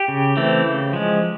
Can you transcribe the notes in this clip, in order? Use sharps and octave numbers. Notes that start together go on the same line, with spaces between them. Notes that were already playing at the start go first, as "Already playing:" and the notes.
Already playing: G4
C#3
E3 A3 C4
C#3
F3 G#3